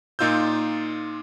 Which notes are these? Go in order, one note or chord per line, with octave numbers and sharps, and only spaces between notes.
A#2 D#4 F4 E6 G6